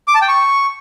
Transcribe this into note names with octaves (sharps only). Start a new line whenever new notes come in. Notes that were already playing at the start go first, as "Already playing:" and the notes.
D6
A5
G5
C#6